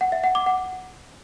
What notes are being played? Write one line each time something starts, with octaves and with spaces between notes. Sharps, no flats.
F#5
E5
F#5
D6
F#5